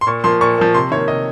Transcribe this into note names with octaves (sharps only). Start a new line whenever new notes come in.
C6
A#2 C#6
F3 A#3 C6
A#2 C#6
F3 A#3
C3 C6
D#3 A#3 C#5
C3 D#5